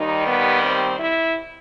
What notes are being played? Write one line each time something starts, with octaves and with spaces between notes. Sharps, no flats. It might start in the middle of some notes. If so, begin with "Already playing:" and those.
Already playing: D#2 D#3 G3 D#4
B3
C4
E4